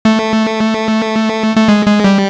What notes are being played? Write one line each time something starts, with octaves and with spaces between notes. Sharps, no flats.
A3
A3
G#3
G#3
G3